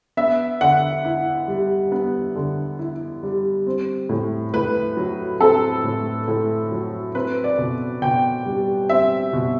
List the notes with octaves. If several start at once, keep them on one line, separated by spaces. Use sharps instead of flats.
B3 E5
D3 F#5
E4
G3
B3
D3
E4
G3
C4
A2
A2 B4
F#3
C4 A4
A2
A2
F#3
C4 B4
D5
B2
B2 G5
G3
C4 E5
B2